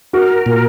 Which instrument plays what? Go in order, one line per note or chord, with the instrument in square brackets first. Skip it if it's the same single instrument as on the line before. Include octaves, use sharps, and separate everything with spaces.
[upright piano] F#4 [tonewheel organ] A#4
[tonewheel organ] A#2